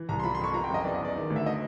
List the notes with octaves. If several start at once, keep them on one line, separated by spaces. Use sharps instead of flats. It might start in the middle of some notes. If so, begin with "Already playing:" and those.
Already playing: E3
C2 A#5
C6
F3 B5
C6
F2 C#6
F3 A#5
G5
F#2 D#5
E2 D5
D#5
E2 D5
D#3
D2
E5
D#5